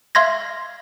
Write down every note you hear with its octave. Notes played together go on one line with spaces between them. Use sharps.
E5 F5 C6 G#6 A#6